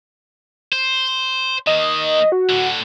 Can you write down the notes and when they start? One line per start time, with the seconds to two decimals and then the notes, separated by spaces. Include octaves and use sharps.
0.72 C5
1.67 D#3 A#3 D#5
2.32 F#4
2.49 A2 D3